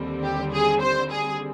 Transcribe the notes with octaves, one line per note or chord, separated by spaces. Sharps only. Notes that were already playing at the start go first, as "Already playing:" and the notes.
Already playing: D#2 D3 G3 C4
G4
G#4
C5
G#4